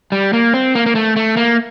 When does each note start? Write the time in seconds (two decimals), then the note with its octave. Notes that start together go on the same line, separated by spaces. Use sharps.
0.12 G3
0.33 A#3
0.54 C4
0.75 A#3
0.86 A#3
0.95 A3
1.16 A3
1.37 A#3